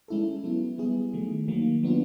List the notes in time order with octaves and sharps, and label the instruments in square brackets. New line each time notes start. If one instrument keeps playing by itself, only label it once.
[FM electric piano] G#3 C#4 E4 A4
F#3 B3 E4
G3 B3 E4 G#4
D#3 F#3 A3
D#3 F#3 A#3
F#3 B3 D4 F4